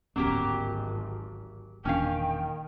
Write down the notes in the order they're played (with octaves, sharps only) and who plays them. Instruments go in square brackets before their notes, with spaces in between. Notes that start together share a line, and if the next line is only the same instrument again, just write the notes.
[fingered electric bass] D1 B3 C#4 [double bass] G#1 [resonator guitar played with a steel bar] F#3 A#3 G4
[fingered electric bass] E1 A#2 D4 [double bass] D#3 [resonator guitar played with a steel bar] C#4 F5 [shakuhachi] G5